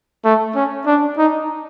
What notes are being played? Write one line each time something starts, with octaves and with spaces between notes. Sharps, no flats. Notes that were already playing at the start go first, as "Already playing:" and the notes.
A3
C#4
D4
D#4